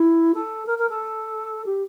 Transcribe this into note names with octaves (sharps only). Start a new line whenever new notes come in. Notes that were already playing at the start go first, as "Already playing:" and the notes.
Already playing: E4
A4
A#4
A#4
A4
G4